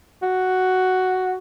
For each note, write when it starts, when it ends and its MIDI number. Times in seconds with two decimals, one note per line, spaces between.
0.22 1.36 66